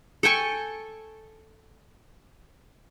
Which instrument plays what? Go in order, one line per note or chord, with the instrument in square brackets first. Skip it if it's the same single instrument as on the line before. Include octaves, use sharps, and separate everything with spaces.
[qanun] A4 G5 G#5 C#6